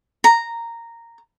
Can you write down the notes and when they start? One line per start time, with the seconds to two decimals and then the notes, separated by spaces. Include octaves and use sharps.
0.24 A#5